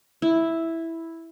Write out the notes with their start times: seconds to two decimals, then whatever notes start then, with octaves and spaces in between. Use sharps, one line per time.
0.22 E4